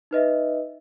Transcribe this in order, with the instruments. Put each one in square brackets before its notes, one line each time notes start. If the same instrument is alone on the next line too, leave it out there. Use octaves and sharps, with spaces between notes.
[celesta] D#4 B4 D#5 E5